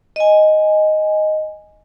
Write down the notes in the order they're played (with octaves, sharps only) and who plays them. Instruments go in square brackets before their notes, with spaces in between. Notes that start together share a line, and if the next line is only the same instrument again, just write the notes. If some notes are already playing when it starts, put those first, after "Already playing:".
[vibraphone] D#5 G#5